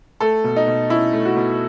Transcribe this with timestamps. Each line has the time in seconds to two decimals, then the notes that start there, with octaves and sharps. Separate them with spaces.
0.20 A3 A4
0.44 B2
0.56 D#4
0.67 B2
0.90 C#4 E4
1.13 A3
1.25 F#4
1.37 B2